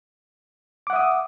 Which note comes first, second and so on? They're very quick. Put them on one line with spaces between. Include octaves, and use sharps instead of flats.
D6 F#5 E5 D#6